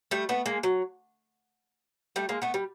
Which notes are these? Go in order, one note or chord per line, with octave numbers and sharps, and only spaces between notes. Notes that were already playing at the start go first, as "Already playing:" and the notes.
G3 A3
A3 B3
G#3 A#3
F#3
G3 A3
G#3 A#3
A3 B3
G3